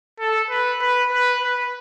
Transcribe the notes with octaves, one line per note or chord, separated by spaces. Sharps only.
A4
B4
B4
B4
B4